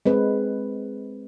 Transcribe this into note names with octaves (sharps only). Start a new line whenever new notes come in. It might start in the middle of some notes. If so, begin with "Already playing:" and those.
G#3 C4 B4